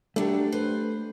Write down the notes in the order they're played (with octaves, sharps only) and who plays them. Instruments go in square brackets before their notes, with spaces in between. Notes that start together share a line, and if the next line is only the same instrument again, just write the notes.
[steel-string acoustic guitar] F#3 D4 [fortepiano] G3 G4 A4 [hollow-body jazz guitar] A3
[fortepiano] B4 [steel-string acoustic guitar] C5